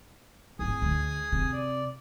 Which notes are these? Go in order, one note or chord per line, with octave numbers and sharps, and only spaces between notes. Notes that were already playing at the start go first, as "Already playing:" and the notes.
G#1 A2 G#4 G#5 D#6
D2
C3
D5